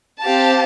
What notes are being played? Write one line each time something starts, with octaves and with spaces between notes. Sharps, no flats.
C4 G4 F5 A5